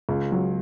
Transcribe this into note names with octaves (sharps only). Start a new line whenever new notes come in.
C#2
F#3